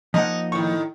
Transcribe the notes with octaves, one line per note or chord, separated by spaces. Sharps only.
F3 A#3 D#4 D#5 F#5
A2 D#3 E4 C#6